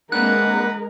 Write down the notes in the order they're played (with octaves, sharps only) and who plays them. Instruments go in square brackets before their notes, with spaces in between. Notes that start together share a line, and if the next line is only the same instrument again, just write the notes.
[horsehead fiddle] G#3 A#4 [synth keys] A#3 C4 D4 [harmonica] B4 F#5 [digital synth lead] F#6